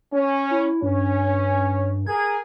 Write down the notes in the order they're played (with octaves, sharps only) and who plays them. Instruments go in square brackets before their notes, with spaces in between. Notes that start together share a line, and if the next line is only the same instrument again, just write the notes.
[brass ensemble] C#4
[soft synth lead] E4
[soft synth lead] G2 [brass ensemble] C#4
[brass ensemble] G#4 A#4 [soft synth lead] G#6